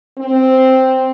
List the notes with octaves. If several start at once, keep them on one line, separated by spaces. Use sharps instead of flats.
C4